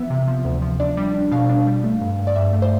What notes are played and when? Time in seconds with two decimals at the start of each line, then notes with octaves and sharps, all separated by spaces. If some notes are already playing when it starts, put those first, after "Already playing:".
Already playing: E3 F3 B3 E5
0.10 C3
0.28 F3
0.45 D2
0.62 F3
0.80 D4 D5
0.97 G3
1.14 D4
1.31 B2 F5
1.49 D4
1.67 G3
1.84 A3
2.01 G2
2.19 G2
2.27 D5
2.36 G2 E5
2.53 A3
2.62 C5